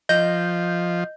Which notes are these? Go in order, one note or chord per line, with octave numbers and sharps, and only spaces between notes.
F3 D#5 G6